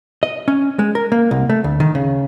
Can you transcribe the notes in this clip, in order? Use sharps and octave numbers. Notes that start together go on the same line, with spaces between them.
D#5
C#4
G#3
A#4
A#3
C2
A3
D2
D#3
C#3